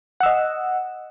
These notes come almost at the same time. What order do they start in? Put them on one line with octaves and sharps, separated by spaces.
F#5 E6 D#5